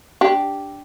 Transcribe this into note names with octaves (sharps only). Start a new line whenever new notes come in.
D4 G4